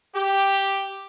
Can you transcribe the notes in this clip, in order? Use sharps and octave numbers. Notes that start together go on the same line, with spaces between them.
G4